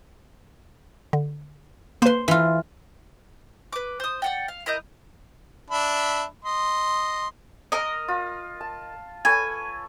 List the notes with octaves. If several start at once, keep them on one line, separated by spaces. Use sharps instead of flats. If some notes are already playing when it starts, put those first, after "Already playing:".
D3
A#3 B4 C5 C6
E3 F4
B4 D6
C5 D#6
D5 F#5 G5
F5
E4 A#4 D#5 G6
D4 E5 B5
D#5 C6
A#4 D#5
F4
A5
A4 B4 C#5 G#5